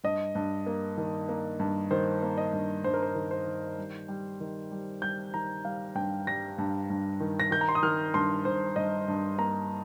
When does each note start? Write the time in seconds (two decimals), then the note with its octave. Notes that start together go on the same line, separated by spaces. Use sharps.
0.04 G2 D#5
0.35 G2
0.67 A#3
0.97 D#3
1.29 A#3
1.60 G2
1.91 D#3 C5
2.23 A#3
2.38 D#5
2.53 G2
2.84 G2 C5
2.94 A#4
3.02 C5
3.15 D#3
3.31 C5
3.47 D#3
3.78 G3
4.08 G3
4.40 D#3
4.71 G3
5.02 G3 G6
5.34 D#3 A#5
5.65 G3 F5
5.95 G2 G5
6.27 G3 A#6
6.58 G2
6.90 G2
7.20 D#3
7.40 A#6
7.51 D#3 G6
7.61 A#5
7.69 C6
7.75 D#6
7.83 D#3 F6
8.14 G2 C6
8.45 G2 C5
8.76 G2 D#5
9.08 G2
9.38 A#3 A#5